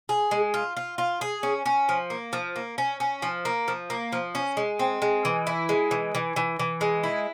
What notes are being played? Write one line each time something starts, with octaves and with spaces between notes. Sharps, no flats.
G#4
G#3
F4
F4
F4
G#4
C#4
C#4
F3
A#3
F3
A#3
C#4
C#4
F3
A#3
F3
A#3
F3
C#4
G#3
C4
G#3
E3
E4
G#3
E3
E3
E3
E3
G#3
E4